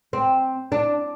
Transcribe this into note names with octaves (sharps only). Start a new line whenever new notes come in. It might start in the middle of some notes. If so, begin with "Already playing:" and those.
C4
D4